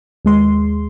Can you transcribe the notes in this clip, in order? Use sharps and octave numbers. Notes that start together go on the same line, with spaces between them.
D#2 G#3 C6